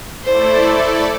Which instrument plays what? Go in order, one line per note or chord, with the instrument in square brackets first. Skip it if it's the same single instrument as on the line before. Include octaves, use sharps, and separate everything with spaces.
[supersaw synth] A3 E4 A4 D5 [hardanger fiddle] C5